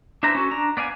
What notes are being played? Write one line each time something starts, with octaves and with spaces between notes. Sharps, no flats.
D4 E4 B4 C5 A#5
C#4 F#4 A4
D4 A#5
B3 D5 F5 G#5